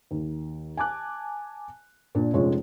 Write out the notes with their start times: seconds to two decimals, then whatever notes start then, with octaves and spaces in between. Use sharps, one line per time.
0.11 D#2
0.77 G#5 A5 D6 F#6
2.15 A#2 D4
2.34 F1 F3 G#3 C#4 F4 C#5